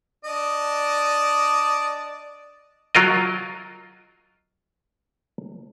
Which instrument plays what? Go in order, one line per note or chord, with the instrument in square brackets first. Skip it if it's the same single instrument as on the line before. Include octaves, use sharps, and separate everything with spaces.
[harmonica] D4 D5 D#5
[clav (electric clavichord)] F#3 F4 A#4 D#5